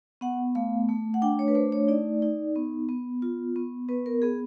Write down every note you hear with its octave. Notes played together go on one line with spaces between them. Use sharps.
B3 F#5
A3 F5
A3
F#5
D4 G5
C#5
B4
A3 C5
C#5
D#4 D5
D#4
B3
B3
F4
B3
B3 B4
A#4
B3 G#4